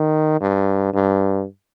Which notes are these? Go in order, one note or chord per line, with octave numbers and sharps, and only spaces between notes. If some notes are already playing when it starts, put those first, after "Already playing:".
Already playing: D#3
G2
G2